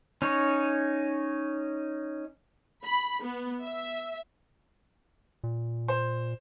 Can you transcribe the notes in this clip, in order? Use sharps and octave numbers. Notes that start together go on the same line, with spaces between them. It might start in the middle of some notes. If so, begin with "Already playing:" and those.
C#4 D#4 C#5
B5
B3
E5
A#2
C5